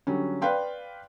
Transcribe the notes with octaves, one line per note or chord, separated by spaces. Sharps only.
D3 F#3 G3 C#4
B4 D5 F5 G5 C6